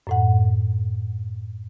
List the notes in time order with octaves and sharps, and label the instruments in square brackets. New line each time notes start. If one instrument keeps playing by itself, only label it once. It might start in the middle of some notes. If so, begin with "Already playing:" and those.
[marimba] F#2 A2 F#5